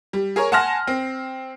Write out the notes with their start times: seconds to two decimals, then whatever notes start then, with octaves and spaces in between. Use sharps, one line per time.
0.13 G3
0.36 G#4 A#4 C#5
0.52 F#5 G#5 A5 C6 F6 A#6
0.87 C4